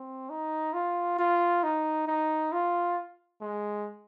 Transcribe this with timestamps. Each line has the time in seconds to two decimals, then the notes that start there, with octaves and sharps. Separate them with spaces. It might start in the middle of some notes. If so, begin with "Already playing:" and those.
Already playing: C4
0.30 D#4
0.73 F4
1.18 F4
1.63 D#4
2.07 D#4
2.53 F4
3.41 G#3